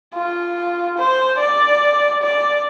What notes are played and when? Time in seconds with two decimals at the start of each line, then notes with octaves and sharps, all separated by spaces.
0.15 F4
0.98 C5
1.38 D5
2.22 D5